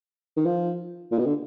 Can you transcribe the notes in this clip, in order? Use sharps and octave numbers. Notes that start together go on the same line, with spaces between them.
D#3
F3
A#2
B2
D3